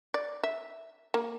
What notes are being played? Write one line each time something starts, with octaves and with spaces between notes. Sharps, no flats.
D5
E5
A#3